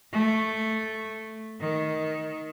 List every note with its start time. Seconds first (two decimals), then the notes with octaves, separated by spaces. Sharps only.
0.12 A3
1.60 D#3